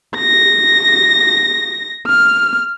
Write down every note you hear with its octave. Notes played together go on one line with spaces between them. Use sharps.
A#6
F6